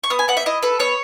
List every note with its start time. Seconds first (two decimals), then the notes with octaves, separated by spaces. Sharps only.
0.04 C#6
0.10 B3 D#6
0.19 G#5
0.28 B3 F#5
0.37 E5
0.46 E4 D#5
0.63 A4 B4
0.79 B3 C#5